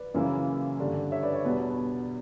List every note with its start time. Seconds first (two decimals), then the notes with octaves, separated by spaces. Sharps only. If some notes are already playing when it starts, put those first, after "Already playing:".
Already playing: B4 D5
0.14 F#2 C#3 E3 A#3 E4
0.80 G2 D3 G3
1.12 C#5 E5
1.23 B4 D5
1.33 C#5
1.44 E2 B2 G3 B3 D4 B4